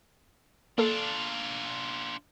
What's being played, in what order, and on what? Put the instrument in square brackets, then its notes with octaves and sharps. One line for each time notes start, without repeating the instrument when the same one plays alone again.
[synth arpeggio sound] A#3 A4 [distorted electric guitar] D4 F4